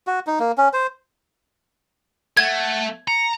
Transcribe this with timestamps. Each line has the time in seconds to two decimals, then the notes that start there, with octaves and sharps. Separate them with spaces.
0.07 F#4
0.27 D#4
0.40 A#3
0.58 C#4
0.73 C5
2.37 A3 F#5 G#6
3.08 A#5 C#7